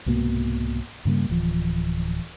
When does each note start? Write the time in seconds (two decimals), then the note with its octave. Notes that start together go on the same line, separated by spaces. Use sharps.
0.06 C2 G#2 B2 A#3
1.05 G2 C#3 G3 A#3
1.30 D1 E3 F3